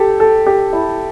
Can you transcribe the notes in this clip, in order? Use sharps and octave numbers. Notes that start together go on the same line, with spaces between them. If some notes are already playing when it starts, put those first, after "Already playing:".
Already playing: G4 A4
A4
G4
E4